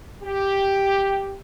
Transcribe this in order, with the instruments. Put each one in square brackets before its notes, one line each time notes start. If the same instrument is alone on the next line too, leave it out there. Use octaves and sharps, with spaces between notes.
[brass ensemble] G4